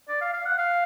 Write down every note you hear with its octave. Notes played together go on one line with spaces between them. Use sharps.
D5
F5
F5
F#5
F5